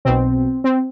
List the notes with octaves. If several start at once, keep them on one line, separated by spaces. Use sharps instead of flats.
B1 B2 C4
C4